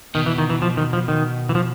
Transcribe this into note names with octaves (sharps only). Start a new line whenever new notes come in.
B2 D#3
E3
D#3
E3
F3
D#3
F3
D#3
E3
F3